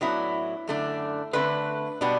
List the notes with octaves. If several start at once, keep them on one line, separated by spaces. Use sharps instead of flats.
A2 F#3 B3 D4 E4
F#2 D3 A3 D4
D3 A3 C4 B4
B2 G3 B3 D4